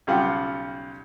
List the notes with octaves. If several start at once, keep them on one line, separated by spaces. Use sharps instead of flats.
B1 C#3 G3 F4 G4 F#5